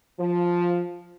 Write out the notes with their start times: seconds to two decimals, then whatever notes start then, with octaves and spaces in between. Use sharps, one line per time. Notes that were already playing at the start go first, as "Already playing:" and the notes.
0.18 F3